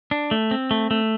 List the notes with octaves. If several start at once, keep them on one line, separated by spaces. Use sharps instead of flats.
D4
A3
C4
A3
A3